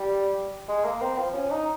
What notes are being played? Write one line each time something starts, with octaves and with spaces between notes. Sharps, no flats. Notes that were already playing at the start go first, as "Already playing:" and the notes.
Already playing: G3
G#3
A#3
C4
F3
C#4
D#4